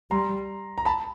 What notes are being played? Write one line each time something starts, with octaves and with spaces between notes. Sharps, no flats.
G3 A#5 C6
A#5
A5 B5